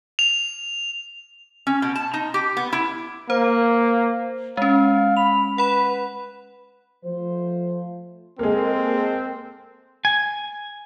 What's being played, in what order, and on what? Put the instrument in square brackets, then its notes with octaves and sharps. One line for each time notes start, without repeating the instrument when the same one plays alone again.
[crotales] F7
[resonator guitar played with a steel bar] C#4
B2
A5
D#4
G4
B3
E4
[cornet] A#3 [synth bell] C5
[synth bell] G#3 C#4 [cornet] F5
[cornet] B5 [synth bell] F7
[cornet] B4 [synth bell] F#5 B5
[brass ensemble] F3 A3 F4 C5
[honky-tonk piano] G#3 A#3 [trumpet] C4 [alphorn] A4
[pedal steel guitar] G#5